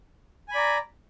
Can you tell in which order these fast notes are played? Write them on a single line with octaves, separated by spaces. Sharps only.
G#5 B5 D5 A#5